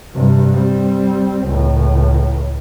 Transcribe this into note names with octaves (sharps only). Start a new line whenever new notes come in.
G2 C3
G3 C4
C#2 A2